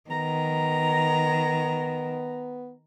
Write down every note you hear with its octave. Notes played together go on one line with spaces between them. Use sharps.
D#3 B3 A#5